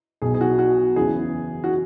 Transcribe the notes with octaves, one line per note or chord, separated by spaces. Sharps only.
B1 B2 G#4
G#4
F#4
F#4
F#1 E2 C#3 E3 G#4
F#4